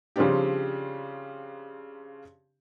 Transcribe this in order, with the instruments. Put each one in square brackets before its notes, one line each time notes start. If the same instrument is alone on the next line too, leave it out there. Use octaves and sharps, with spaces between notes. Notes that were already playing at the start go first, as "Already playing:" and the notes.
[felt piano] C#3 F3 G3 C4 D4 G4